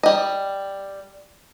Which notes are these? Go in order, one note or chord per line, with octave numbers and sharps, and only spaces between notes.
G3 D#5